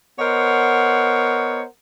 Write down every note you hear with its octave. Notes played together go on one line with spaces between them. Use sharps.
B3 A#4 C5 C#5 D#5 F#5